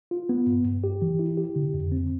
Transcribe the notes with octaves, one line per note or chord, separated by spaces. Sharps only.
F4
B3
G2
G2
G4
E3
E4
G4
D3
F2
C4